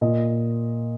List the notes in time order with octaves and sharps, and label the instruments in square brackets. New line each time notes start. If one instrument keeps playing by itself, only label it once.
[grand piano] A#2 D#5